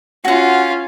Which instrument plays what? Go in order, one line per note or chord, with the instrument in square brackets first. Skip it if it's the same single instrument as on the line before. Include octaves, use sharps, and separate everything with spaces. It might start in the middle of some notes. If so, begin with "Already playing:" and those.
[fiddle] C#4 F4 [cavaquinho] F#4 F#5